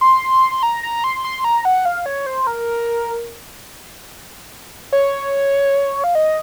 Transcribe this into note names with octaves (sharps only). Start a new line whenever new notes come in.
C6
A#5
A#5
C6
C6
A#5
F#5
F5
C#5
C5
A#4
C#5
F5
D#5